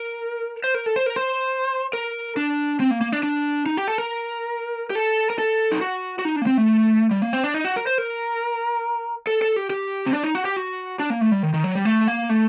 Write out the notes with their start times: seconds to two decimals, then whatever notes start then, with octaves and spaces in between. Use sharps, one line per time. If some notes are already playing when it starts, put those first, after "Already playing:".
Already playing: A#4
0.64 C5
0.74 A#4
0.86 A4
0.96 C5
1.06 A#4
1.16 C5
1.93 A#4
2.37 D4
2.80 C4
2.91 A#3
3.01 A#3
3.12 D4
3.23 D4
3.66 D#4
3.77 G4
3.88 A4
3.98 A#4
4.90 G4
4.95 A4
5.30 A#4
5.39 A4
5.72 D#4
5.81 F#4
6.19 F#4
6.25 D#4
6.36 D4
6.42 A#3
6.47 C4
6.57 A3
7.11 G3
7.22 A#3
7.33 C4
7.44 D4
7.54 D#4
7.65 F#4
7.76 A#4
7.87 C5
7.98 A#4
9.27 A4
9.42 A4
9.56 G4
9.70 G4
10.06 C4
10.13 D4
10.24 D#4
10.35 F#4
10.45 G4
10.56 F#4
10.99 D4
11.10 A#3
11.21 A3
11.32 G3
11.43 D#3
11.54 D#3
11.64 F#3
11.75 G3
11.85 A3
12.08 A#3
12.29 A3